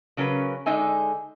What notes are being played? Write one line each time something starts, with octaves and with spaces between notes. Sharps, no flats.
C#3 F#3 C#4 A#4 B4
D3 G#3 D#4 E5 G#5